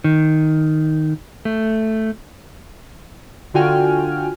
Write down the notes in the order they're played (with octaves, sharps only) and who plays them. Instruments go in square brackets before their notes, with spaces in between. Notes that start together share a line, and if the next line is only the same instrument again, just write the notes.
[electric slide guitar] D#3
A3
[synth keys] D3 F4 F#4 G5 G#5 F6